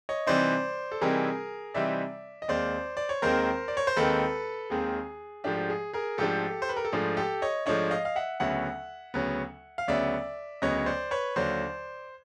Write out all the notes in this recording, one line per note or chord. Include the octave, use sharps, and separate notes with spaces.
C#5 D#5
C3 E3 G3 C4 D#4 C5 D5
A4
C3 E3 G3 C4 D#4 G#4 A#4
C3 E3 G3 C4 D#4 D5 E5
D#5
D#2 D#3 G#3 C4 C5 D5
D5
C#5
D#2 D#3 G#3 C4 A#4 C5
D5
C#5
C5
D#2 D#3 G#3 C4 A4 B4
D#2 D#3 G#3 C4 G#4
G#2 F3 A3 D4 G4
G#4
G#4 A#4
G#2 F3 A3 D4 G4 A4
C5
B4
A#4
A4
G#2 F3 A3 D4 G#4
G4 A4
C#5 D#5
G#2 F3 A3 D4 C#5 D#5
D#5 F5
F5
E5 F#5
D2 C#3 F#3 B3 E5 F#5
D2 C#3 F#3 B3
F5
D2 C#3 F#3 B3 D5 E5
D2 C#3 F#3 B3 C#5 D#5
C5 D5
B4 C#5
D#2 D3 F#3 C5 D5